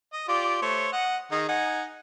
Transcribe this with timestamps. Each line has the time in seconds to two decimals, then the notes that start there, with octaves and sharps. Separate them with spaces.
0.13 D#5
0.28 F4 G4 D5
0.62 A3 C5 C#5
0.93 D#5 F#5
1.32 D#3 D#4 G#4
1.49 D#4 F#5 G#5